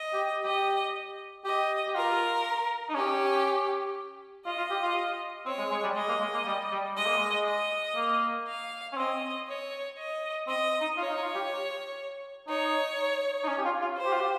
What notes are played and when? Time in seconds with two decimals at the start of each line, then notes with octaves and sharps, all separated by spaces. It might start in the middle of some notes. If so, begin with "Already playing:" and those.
Already playing: D#5
0.13 G4
0.44 G4 D#5
1.44 G4 D#5
1.87 G4
1.95 F4 A#4
2.89 D#4
2.95 C#4 G4
4.46 F4 D#5
4.58 F4
4.70 G4
4.83 F4
5.46 C4 C#5
5.58 G#3
5.71 G#3
5.83 G3
5.96 G#3 D#5
6.08 A#3
6.21 G#3
6.34 A#3
6.46 G3
6.71 G3
6.96 G#3 D#5
7.06 A#3
7.17 G#3
7.46 D#5
7.96 A#3
8.47 F5
8.93 C#4
8.97 C4 D#5
9.47 C#5
9.97 D#5
10.47 C4 D#5
10.81 D#4
10.97 F4 C#5
11.10 D#4
11.22 F4
11.35 G4
12.48 D#4 C#5
13.43 D#4
13.48 C#4
13.58 G4
13.65 F4
13.81 F4
13.98 C5
14.06 G4
14.13 F4
14.20 G4